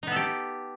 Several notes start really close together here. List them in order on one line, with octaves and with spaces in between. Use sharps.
D#4 B3 A4 G4